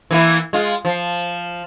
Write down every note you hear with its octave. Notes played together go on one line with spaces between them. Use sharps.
E3 A#3 E4
G#3 F4
F3